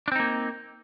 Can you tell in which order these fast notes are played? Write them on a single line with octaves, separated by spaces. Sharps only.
D4 C4 D#4 A#3